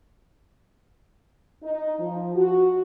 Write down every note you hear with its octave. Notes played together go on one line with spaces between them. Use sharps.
D#4
F3
F#4